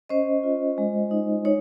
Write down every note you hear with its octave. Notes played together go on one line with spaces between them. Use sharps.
C#4 C5 D#5
F4
G#3
D#4
D#4 C#5